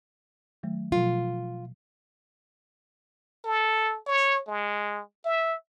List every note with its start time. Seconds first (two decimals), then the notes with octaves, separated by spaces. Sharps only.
0.63 D#3 F#3 A3
0.92 B2 F3 F#3 F4
3.44 A4
4.06 C#5
4.47 G#3
5.25 E5